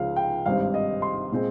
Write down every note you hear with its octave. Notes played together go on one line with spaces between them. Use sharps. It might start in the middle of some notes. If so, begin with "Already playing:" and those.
Already playing: C#2 C#3 F3 F5
G5
G#1 G2 G3 C4 F5
D#5
C6
A#2 G#3 C4